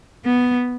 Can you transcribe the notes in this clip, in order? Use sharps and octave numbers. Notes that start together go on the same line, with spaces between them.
B3